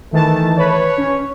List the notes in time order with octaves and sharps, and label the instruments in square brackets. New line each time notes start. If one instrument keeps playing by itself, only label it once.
[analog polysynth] D#3 E3 A5 [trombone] A3
[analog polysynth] B4 [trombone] C#5
[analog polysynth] C#4